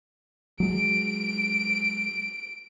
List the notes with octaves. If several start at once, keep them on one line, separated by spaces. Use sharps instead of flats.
F#3 G#3 D7